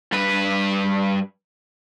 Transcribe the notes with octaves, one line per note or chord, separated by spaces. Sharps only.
G2 B4